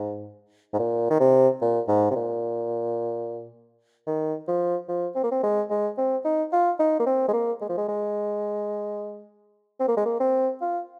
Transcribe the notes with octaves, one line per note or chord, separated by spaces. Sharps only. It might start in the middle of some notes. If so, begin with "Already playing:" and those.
Already playing: G#2
G#2
A#2
D#3
C3
A#2
G#2
C3
A#2
D#3
F3
F3
C4
A#3
C4
G#3
G#3
C4
D#4
F4
D#4
A#3
C4
G#3
A#3
G#3
F3
G#3
G#3
C4
A#3
G#3
A#3
C4
F4